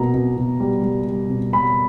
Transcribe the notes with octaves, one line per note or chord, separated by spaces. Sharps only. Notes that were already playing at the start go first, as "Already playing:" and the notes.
Already playing: B2 A#3 A#5
B2
B2
G3
G3
G3
B2
G3 B5